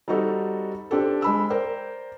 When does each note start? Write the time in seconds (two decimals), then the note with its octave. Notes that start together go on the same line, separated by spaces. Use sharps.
0.08 G3 C4 D#4 F#4 A4
0.91 C4 D4 G4 A4
1.22 G#3 B5 E6
1.50 A#4 C5 D5 G5